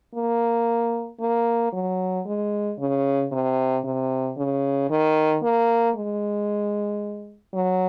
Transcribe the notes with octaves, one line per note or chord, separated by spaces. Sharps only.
A#3
A#3
F#3
G#3
C#3
C3
C3
C#3
D#3
A#3
G#3
F#3